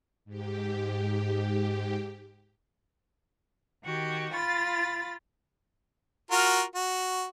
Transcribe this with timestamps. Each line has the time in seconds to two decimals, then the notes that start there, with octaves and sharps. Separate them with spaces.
0.25 G#2 G4
3.82 D#3 F#4 G4
4.34 F4 B5 A6
6.31 F4 F#4 A#4
6.75 F#4